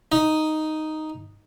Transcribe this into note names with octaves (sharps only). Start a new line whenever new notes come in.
D#4